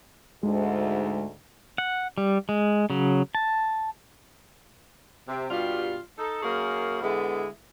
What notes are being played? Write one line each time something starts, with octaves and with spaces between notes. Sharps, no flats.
D2 G#2 G#3
F#5
G3
G#3
C#3 F#3
A5
C3
G2 B2 G3 F4
D#4 A4
F#2 A#3 G#4 A#4 C#5
D3 G#3 B3 E4